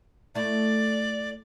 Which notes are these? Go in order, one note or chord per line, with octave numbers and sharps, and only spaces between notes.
A3 E4 D5